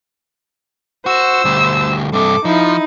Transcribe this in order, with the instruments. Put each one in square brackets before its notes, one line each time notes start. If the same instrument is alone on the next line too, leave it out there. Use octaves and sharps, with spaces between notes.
[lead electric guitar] F#4 [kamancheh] C5 E6
[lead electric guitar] D2 G3
[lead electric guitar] G2 C3 [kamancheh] A4 D6
[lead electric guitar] F3 [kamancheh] D#4 E4